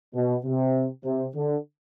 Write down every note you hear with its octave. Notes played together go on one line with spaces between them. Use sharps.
B2
C3
C3
D3